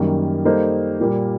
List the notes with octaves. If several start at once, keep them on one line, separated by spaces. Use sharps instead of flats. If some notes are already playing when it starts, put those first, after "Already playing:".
Already playing: F#2 D#3 G3 A#3
G3 A#3 D#4 A4 C5
A#2 G3 A#3